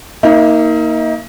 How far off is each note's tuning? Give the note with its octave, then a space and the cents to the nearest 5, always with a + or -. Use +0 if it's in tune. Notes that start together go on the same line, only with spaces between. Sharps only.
A#3 +0 D#4 +30 F5 -45